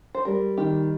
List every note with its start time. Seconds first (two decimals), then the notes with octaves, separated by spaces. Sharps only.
0.14 C5
0.25 G3 A#4
0.57 D#3 G4